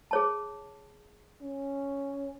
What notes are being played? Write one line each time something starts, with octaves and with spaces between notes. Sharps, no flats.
G#4 C#5 A5
C#4